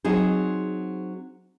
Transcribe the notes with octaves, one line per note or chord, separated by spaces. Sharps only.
F#3 C4 D#4 G#4